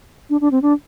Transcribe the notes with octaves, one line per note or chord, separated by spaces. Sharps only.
D4
D4
C4
D4